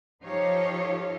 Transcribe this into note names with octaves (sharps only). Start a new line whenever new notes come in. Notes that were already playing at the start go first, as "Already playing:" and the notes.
F3 D#4 G4 A4 C#5 F5